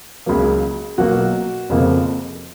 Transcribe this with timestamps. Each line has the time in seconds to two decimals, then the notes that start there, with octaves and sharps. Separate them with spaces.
0.26 C#2 C#3 F#3 A#3
0.98 B1 B2 F#3 A#3 F#4
1.70 F1 F2 C#3 F3 A#3